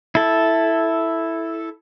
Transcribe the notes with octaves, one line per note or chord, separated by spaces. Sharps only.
E4 A4